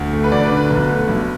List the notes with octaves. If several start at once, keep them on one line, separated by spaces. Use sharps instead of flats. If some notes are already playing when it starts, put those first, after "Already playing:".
Already playing: D2
A3
B4
D2 D5
B4
D3
B4
B1
A3
B1